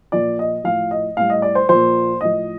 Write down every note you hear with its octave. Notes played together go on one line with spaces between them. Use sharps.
A#2 F3 D5
D#5
A2 F3 F5
D#5
A2 G3 F5
D#5
D5
C5
A#2 F3 C5
A2 F3 D#5